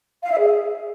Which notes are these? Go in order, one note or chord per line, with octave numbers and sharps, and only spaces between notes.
F5
E5
G#4